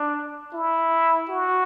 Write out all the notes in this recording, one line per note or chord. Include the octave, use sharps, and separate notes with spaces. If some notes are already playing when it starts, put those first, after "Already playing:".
Already playing: D4
E4
F#4